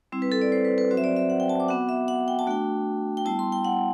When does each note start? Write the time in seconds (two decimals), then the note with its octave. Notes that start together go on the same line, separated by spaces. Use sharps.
0.12 G3 C4 E4
0.22 B4
0.32 A4
0.42 D5
0.52 C5
0.65 B4
0.78 B4
0.91 F#3 C4 F#4 C5
0.97 E5
1.04 D5
1.16 E5
1.30 F#5
1.40 G5
1.49 A5
1.60 D6
1.68 B3 F#4 F#5
1.89 E5
2.08 F#5
2.28 G5
2.39 A5
2.47 A3 D4 F#4 G5
3.17 G5
3.25 G3 B3 E4 A5
3.39 C6
3.52 G5
3.65 F#5